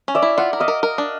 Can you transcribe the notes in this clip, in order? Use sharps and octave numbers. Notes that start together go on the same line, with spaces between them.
C#4
D5 E5
E4
F4 E5 F#5
A#4
D#5 F5
A#4
A#4
D4